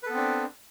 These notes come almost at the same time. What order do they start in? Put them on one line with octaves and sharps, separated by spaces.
B4 A4 B3 C4 D4